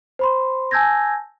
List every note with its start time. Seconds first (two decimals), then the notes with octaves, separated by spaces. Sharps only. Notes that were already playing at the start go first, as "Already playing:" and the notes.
0.19 C5 B5 C6
0.71 G#5 A5 E6 G6 G#6 A#6